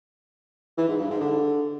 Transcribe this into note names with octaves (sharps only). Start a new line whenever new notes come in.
E3
G#2
G2
G#2
D3